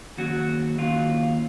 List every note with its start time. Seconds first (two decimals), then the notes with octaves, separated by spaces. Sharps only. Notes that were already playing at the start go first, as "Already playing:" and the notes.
0.17 D#2 C#3 F#3 F#4
0.78 D#2 C#3 F#3 F4